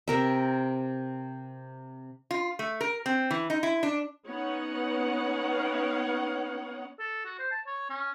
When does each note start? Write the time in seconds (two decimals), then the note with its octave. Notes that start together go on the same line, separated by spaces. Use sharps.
0.08 C3 A#4 E5
2.31 F4
2.59 A3
2.81 A#4
3.06 C4
3.31 E3
3.50 D#4
3.63 E4
3.83 D4
4.29 B3 C#4 D#4 C#5 F#5
6.99 A4
7.25 F#4
7.39 C5
7.51 A5
7.67 C#5
7.90 C#4